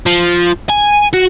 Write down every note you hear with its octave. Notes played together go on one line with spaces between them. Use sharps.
F3
G#5
F#4